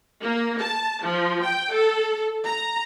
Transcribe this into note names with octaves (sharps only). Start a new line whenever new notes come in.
A#3
A5
F3
G5
A4
A#5